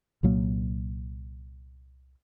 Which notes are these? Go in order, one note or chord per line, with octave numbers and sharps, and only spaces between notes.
C2 A#2 F#3 A#3